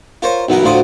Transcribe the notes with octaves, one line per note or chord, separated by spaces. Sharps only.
F4 A#4 C5 C#5
B1 E3 B3 A#4 F#5
D2 A2 F#3 F4 C5 D#6